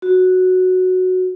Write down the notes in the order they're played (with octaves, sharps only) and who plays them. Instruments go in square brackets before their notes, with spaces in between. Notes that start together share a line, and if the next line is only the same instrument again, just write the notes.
[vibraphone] F#4